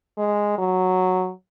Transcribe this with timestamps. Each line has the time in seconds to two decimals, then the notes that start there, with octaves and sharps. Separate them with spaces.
0.18 G#3
0.59 F#3